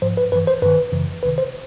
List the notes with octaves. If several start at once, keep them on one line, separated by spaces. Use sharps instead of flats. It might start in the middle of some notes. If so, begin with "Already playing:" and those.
G#2 F3 C5
B4
G2 E3 B4
C5
G2 D#3 B4
F#2 C#3 E3
C#2 C3 D#3 B4
C5